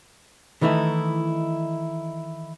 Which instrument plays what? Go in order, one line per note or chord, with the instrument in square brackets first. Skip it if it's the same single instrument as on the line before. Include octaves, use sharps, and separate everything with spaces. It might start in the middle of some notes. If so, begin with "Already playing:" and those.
[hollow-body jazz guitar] D#3 E3 A3 D#4 E4